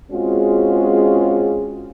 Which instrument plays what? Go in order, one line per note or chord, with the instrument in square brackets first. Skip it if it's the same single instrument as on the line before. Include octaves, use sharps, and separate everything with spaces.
[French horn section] G#3 C4 C#4 F4 F#4 G#4